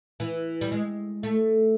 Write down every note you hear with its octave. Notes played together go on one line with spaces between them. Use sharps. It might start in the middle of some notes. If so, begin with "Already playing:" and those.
E3
G3
G#3
A3